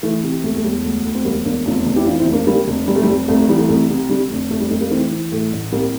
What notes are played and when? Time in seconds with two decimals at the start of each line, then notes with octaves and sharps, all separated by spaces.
0.03 E3 A3
0.23 C3
0.44 E1 A3
0.56 A3
0.64 E1 G3
0.84 D2
1.05 D2
1.15 C4
1.25 E1 G3 A#3
1.45 E1 A#3 D4
1.66 F1 D4 F4
1.86 F1
1.96 E4 G4
2.06 E3 D4 F4
2.20 C4 E4
2.26 F1
2.33 A#3 D4
2.47 D3 G3 A#3
2.68 F1
2.88 F1 G3
2.95 A3
3.03 G3
3.08 F1
3.28 C2 A3
3.39 A3
3.49 E3 G3
3.59 A3
3.69 C2 A3
3.89 C3
4.09 D3 G3
4.30 F1
4.50 F1 A3
4.60 G3
4.70 F2 A3
4.81 G3 A#3
4.91 E3 A3 C4
5.11 E3
5.32 A2 A3
5.52 A1
5.72 C2 G3 A#3